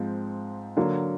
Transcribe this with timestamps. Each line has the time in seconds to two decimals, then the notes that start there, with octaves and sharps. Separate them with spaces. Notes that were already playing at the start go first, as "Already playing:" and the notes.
Already playing: G#2 F3 G#3 C4
0.77 D3 F#3 A#3